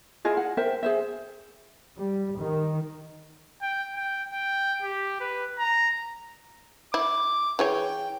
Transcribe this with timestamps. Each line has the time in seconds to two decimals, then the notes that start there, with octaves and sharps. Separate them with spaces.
0.25 E4 F4 G#4 D#5
0.37 F#5
0.57 A#4 C5 E5 G5
0.83 G#4 C5 E5
1.98 G3
2.40 D#3
3.62 G5
3.95 G5
4.30 G5
4.82 G4
5.21 B4
5.59 A#5
6.94 E4 D6
7.59 E3 G#4 C#5 G5